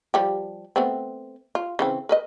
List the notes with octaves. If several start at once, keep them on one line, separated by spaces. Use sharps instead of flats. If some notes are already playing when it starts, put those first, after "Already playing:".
F3 G3 G4
A3 B3 C4
F4
C#3 E3 C4
A#4 B4 D#5